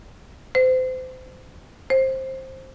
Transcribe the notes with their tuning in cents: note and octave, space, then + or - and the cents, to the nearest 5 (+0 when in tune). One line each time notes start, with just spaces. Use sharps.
C5 -30
C5 +15